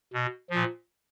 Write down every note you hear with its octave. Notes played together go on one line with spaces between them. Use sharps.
B2
A#2 F3